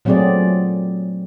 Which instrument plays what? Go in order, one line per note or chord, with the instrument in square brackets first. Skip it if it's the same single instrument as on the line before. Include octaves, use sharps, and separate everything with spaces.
[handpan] A#2 F#3 A3 C4 G#4 D5